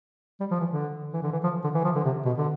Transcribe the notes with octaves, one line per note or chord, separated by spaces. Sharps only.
G3
F3
E3
D3
E3
D3
E3
F3
D3
E3
F3
D3
C3
B2
D3